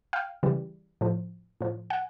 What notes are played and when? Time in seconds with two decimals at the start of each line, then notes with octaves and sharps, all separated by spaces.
0.13 F5 G5
0.43 C#3 E3 G3
1.01 A2 F3
1.61 A2 F3
1.90 F#5 G#5